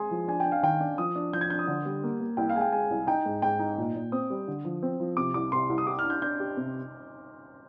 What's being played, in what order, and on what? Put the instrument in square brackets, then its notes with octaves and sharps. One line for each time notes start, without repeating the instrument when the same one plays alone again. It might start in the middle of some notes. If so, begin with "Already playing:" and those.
Already playing: [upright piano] G#3 [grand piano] G#5 C6 D#6
[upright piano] F3
[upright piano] D4 [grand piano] G#5
[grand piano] G5
[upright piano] D4
[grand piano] F5
[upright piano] D#3 [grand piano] G5
[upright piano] D4
[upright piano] F3 [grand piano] D#6
[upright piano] D4
[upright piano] F3 [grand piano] G6
[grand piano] G#6
[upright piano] D4 [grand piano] G6
[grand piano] D#6
[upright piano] D3
G3
A#3
A#3
[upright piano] C2 [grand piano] G5
[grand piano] F5
[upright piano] G#3 [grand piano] G#5
[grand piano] G5
[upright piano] G#3 [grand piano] G#5
[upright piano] C2
[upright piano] D#4 [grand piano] G5
[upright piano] G#2
[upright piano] G#2 [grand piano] G5
[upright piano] D#4
A#2
A#2
[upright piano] C4 [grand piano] D#6
[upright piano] G3
D3
F3
C4
F3
[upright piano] C3 [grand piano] D6
[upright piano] C2 [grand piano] D6
[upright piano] C3 [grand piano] C6
[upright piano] C2
[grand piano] D#6
[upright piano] G4 [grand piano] D6
[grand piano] F6
[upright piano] D4
[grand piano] G6
[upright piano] D4 [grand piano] G6
[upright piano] G4
C3